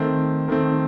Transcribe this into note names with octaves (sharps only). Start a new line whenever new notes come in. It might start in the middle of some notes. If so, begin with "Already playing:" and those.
Already playing: D#3 A3 C4
D#3 A3 C4